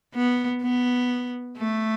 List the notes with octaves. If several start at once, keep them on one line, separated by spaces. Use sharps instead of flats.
B3
B3
A3